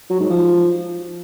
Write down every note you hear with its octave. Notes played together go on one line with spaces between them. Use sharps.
F#3
G#2
F3